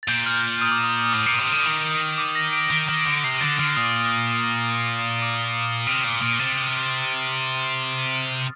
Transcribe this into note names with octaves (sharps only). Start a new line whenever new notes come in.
A6
A#2 G6
F6
D#6
D6
D#6
A2 D#6
A#2 D6
C3 D#6
D3
D#3
D6
A#6
D7
D#3 D7
D#3
D3
C3 C7
D3 A6
D3 F6
A#2 D#6
D6
D#6
C3 F6
A#2
A#2
C3 A6